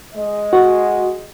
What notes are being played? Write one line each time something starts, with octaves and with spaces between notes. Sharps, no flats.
G#3 D#5
F#4